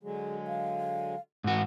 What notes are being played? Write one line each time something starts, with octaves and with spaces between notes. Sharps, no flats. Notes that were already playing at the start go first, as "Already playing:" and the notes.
D3 F#3 G#3 G#4
F5
G#2 F#4